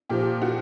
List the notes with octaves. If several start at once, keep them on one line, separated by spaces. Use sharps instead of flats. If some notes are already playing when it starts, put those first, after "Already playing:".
A#2 F3 G4
F#4